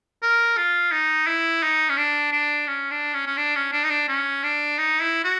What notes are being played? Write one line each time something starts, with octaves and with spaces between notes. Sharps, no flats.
A#4
F4
D#4
E4
D#4
C#4
D4
D4
C#4
D4
C#4
C#4
D4
C#4
D4
D#4
D4
C#4
D4
D#4
E4
F#4